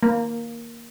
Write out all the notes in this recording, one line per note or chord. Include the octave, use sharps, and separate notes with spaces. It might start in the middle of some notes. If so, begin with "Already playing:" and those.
A#3